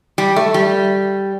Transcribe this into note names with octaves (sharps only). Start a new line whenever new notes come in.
G3
A3
G3